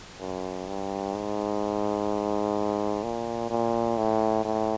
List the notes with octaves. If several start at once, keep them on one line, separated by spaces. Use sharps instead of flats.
F#2
G2
G#2
A#2
A#2
A2
A2